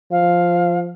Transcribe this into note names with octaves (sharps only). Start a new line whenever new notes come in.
F3 F5